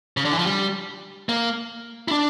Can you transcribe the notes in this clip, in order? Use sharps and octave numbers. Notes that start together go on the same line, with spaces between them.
C#3
D3
E3
F3
G3
A#3
E4
D4